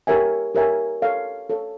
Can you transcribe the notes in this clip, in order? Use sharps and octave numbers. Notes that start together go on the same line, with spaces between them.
G4 A#4 C#5 E5 G#5
G4 A#4 C#5 E5 G#5
A4 C#5 F5
A4 C#5 F5